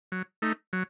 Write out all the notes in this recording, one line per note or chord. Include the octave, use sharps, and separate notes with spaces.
F#3
A3 D#4
F#3